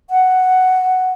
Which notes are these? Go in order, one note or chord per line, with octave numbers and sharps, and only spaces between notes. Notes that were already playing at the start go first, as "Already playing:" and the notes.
F#5